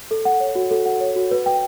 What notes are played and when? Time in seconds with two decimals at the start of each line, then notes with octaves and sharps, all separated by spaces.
0.11 A4
0.25 F#5
0.40 C#5
0.55 F#4
0.71 A4
0.86 F#5
1.01 C#5
1.16 F#4
1.31 B4
1.46 G5